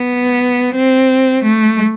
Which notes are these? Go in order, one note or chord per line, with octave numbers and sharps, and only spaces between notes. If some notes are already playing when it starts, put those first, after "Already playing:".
Already playing: B3
C4
A3